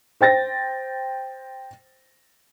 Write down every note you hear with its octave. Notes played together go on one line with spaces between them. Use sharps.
C5 G5 A6 A#6